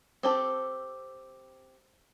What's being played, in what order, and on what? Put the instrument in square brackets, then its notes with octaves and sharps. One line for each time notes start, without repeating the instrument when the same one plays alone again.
[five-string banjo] C4 G4 A4